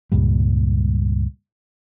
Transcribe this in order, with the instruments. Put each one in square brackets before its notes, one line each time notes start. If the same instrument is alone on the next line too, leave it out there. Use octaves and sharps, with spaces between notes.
[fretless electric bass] C#2 G2 A#2 G3